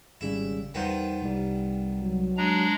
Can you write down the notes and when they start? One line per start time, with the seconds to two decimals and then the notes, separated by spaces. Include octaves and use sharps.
0.21 G#1 C#3 G3 E4
0.74 E2 D#3 G3 B3 F4 C5
1.22 C2 G3
2.00 F#3
2.37 G#3 D4 A#5